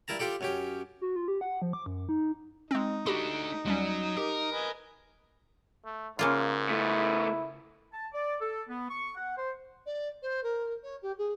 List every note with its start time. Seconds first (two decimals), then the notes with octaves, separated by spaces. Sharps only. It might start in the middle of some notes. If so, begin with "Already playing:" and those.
0.08 G2 E4 A#4 A5 A#5
0.19 F4 G4 A4 D5
0.41 F#2 C#4 G4
1.01 F#4
1.16 F4
1.28 G4
1.41 F#5
1.62 F3
1.73 D6
1.86 F#2
2.09 D#4
2.71 G#3 C4 D#4
3.06 A3 D4 F#4 G4 B5
3.65 D#2 F#3 G3 C#4
4.17 G4 A#4
4.52 B4 D#5 G#5
5.85 A3
6.19 G#2 C#3 A#3 F4
6.69 A3 B3 E4
7.93 A5
8.13 D5
8.40 A4
8.69 B3
8.89 C#6
9.16 F#5
9.37 C5
9.86 D5
10.22 C5
10.43 A#4
10.83 C#5
11.02 G4
11.18 G#4